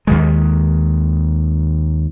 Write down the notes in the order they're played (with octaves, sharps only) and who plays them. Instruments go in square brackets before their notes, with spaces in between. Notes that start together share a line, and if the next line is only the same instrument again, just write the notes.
[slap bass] D#2 D#3 G#3